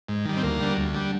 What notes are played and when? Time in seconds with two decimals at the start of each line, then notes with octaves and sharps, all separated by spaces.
0.09 G#2
0.25 D#3 G3
0.37 C4
0.43 D2 A#3
0.60 D3 G3
0.77 D2
0.94 D3 G3